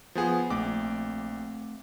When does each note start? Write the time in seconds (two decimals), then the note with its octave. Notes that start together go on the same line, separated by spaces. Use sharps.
0.15 F3 B3 G#4
0.50 A#1 A3 C4 D6